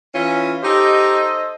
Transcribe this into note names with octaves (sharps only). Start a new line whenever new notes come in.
E3 C#4 F4
D#4 G4 A4 C5 D#5